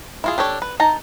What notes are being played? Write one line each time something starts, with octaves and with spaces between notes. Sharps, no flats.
E4 F4 G#4
D4 G4 A4 C#5
B4
D#4 A5 A#5